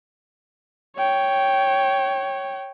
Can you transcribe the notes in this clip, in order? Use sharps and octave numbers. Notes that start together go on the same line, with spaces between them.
C#5 G5